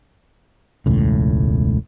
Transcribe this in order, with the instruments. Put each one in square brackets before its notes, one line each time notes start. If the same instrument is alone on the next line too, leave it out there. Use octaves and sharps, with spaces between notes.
[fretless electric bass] E1 C#2 A2